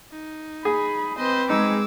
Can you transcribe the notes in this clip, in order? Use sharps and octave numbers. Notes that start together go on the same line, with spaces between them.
D#4
G#4 B5
C4 B4 C5 D#5
G#3 D#4 D6 E6